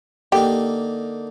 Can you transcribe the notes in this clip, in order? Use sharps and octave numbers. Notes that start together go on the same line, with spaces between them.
D3 A#3 D#4 G4